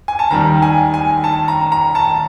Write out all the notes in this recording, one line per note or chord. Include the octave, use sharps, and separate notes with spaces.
G#5
A5
D#2 D#3 G3 A#5
G#5
G#5
A5
A#5
A#5
A5